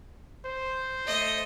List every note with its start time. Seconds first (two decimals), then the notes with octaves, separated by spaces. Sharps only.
0.45 C5
1.06 A3 D#5